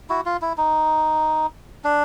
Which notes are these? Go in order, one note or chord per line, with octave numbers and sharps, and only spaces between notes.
E4 F#4
F4
E4
D#4
D4